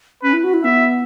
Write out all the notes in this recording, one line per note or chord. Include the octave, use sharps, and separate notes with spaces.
C#4 B4
E4
F#4
E4
B3 E5